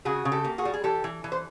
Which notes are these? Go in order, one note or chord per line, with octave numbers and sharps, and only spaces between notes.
C#3 F#4 G#4
C#3
G4 A4
A#3
F#4 G#4
G3
G#4
E3 G4 A4
E3
E3
C5